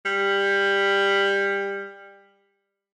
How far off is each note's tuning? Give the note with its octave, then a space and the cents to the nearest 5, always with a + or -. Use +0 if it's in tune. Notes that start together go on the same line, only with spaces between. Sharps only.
G3 +15